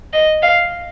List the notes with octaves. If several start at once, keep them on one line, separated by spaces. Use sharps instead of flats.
D#5
F5